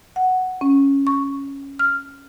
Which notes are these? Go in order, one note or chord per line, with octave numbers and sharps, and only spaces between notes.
F#5
C#4
C#6
F6